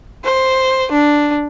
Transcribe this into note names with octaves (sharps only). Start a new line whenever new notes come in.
C5
D4